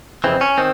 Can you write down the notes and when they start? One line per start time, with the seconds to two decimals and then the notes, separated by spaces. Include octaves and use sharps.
0.24 F2 C#3 E3 C4
0.41 C#4
0.58 D#3 C4